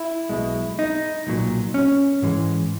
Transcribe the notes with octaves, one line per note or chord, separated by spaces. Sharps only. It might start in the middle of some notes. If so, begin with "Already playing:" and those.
Already playing: E4
B1 B2 G#3
D#4
B1 A#2 F#3
C#4
G#2 E3 G#3